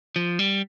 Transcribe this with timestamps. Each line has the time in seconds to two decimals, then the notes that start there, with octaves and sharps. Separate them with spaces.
0.16 F3
0.39 G3